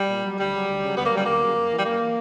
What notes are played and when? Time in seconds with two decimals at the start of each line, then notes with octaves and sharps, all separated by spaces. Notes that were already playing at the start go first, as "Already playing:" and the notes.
Already playing: G3
0.09 A#2
0.23 F#3
0.38 D2 G3
0.52 C#3 F#3
0.67 D2
0.82 C#3 F#3
0.96 D2 B3
1.05 A#3
1.11 C#3 F#3 G3
1.23 D2 A#3
1.41 C#3 F#3
1.55 F#2
1.70 E3
1.79 G3
1.85 F#2 A#3
1.99 E3